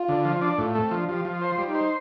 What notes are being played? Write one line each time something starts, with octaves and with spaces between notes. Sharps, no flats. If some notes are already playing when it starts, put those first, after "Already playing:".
Already playing: F4
D3
F3
D4
A2 F4
A3 C4
F3 D4
F3 G4
F3 F4
F4 C5
G3
D#4
C5